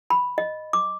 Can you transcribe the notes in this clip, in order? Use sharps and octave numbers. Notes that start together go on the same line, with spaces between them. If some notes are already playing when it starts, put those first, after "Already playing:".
B5
D#5
D6